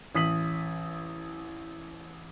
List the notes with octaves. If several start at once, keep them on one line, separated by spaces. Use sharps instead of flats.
A1 D#6 B6 F#7